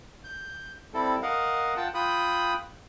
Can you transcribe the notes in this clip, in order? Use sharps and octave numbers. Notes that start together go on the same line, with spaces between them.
G6
G3 C4 E4 A4
A#4 D#5 F5 F#5
F4 F#5 G5 A5
F4 G5 B5 D#6 F#6